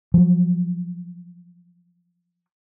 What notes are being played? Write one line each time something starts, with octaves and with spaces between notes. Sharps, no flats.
F3 F#3